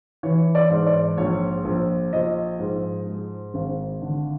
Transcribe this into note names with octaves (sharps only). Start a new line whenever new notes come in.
E3 C#5
D5
G#2
D5
A#1 C#5
A#1
F3 D#5
G#2
G#3
G#1
D3